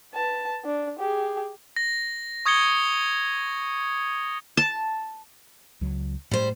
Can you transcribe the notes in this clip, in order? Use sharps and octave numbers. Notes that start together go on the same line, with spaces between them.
B4 A5
D4
G4 G#4
A#6
C#6 D#6 G#6 A#6 C#7 G7
A5
C#2 F#3
A2 G3 C5